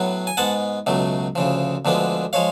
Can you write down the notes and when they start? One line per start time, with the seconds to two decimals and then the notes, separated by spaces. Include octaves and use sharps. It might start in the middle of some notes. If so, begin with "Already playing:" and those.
Already playing: A2 F#3 B3
0.27 G#5
0.37 G#2 G#3 B3 F#5 A5
0.86 C#2 B2 F#3 A3
1.35 D2 C#3 F3
1.85 D2 D3 F3 G#3 B3
2.33 F3 G#3 C#5 F5